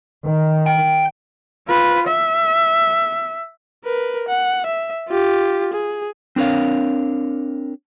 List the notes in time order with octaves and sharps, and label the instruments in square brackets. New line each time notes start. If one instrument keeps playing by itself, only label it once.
[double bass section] D#3
[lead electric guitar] G5
[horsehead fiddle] F4 B4
E5
[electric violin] A#4 B4
F#5
E5
F4 G4
G#4
[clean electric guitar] C4 D4 A#4 C#5 F5